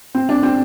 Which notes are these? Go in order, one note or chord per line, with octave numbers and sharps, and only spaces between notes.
C4
D4
C4